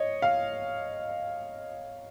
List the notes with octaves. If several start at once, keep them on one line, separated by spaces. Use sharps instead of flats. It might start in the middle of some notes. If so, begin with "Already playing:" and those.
Already playing: C#5 D#5
F5